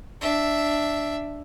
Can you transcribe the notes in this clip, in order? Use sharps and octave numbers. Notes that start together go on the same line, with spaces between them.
D4 E5